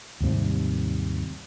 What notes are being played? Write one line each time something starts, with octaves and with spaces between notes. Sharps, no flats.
D#2 G#2 C3 G3